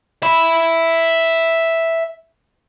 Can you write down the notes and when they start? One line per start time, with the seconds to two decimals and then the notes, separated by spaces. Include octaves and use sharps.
0.23 E5 B5